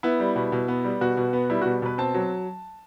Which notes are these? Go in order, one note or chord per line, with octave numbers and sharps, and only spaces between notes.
B3 E4
G3
B2
B2
B3
G3
B2 F#4
B2
B3
G3 E4
B2 F#4
B2 B4
C4 A5
F#3